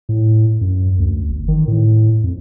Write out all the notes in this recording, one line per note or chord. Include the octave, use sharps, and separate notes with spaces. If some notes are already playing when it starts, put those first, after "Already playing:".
A2
F#2
D2
G1
D#3
A2
F2